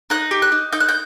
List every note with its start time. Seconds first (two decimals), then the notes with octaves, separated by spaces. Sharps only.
0.10 D#4 F#6
0.31 G4
0.42 F#6
0.52 D#4
0.72 D#4 G6
0.80 F#6
0.89 G6